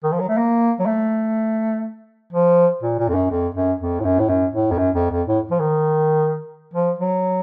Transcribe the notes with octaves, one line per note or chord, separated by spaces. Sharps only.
D#3
F3
F#3
A3
A#3
F#3
A3
F3
A#2
A#2
F2
F#2
F2
F#2
F2
A2
F#2
A2
F#2
A2
F2
F#2
F2
F2
A2
F3
D#3
F3
F#3